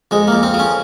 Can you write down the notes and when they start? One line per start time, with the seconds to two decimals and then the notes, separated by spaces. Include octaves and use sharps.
0.11 F2 G#3
0.28 F2 A#3
0.43 C4
0.54 F3
0.59 C#4